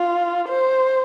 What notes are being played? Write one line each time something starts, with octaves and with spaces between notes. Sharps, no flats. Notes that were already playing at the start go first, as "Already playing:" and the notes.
Already playing: F4
C5